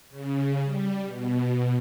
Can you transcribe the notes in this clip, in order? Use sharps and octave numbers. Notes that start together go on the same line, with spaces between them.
C#3
G3
B2